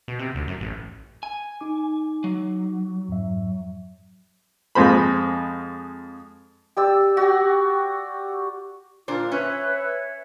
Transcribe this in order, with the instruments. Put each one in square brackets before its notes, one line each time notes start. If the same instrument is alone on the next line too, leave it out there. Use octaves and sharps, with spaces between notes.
[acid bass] B2
C3
D2
F#2
A1
[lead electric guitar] G#5
[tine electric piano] D#4 D6
[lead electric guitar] F#3
[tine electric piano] F2 G#2 E5
[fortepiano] F2 G#3 C5 B5
[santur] G4 D5 E6
F#4 G4
[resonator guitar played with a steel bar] A#2 D4 C5 [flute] F4
[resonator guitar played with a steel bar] C#4 [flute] B4 [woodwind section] C#5 E5